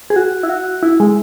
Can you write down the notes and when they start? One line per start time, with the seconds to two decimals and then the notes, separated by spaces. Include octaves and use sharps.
0.10 G#4
0.16 F#4
0.43 E4
0.49 F#4
0.83 E4
1.00 G#3